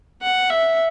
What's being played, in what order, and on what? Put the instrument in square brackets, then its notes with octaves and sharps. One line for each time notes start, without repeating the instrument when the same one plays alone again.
[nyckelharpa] F#5
E5